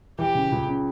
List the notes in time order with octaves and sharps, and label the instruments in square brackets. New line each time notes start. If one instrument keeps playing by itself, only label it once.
[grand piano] E3 [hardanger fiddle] G4
[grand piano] C#3
C#2
C#3